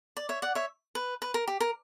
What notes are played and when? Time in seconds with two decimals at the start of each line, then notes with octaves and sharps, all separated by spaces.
0.17 D5
0.29 C#5 E5
0.42 D5 F#5
0.55 C#5 E5
0.95 B4
1.22 B4
1.34 A#4
1.47 G4
1.60 A#4